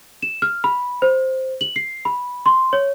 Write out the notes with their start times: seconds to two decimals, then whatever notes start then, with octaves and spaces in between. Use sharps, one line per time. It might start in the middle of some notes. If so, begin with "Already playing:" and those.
0.22 E7
0.42 F6
0.64 B5
1.02 C5
1.61 F#7
1.76 C7
2.05 B5
2.46 C6
2.73 C#5